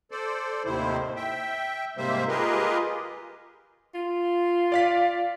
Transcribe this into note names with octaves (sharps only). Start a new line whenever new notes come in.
A4 C5 D5
D#2 A2 C3 D#3 E4 C5
E5 G5
G#2 C3 G3 A#3 C5 E5
F4 G4 G#4 A#4 B4 D#5
F4
D5 F5 B6